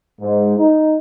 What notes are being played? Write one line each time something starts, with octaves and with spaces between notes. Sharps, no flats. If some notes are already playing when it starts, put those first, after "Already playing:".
G#2
D#4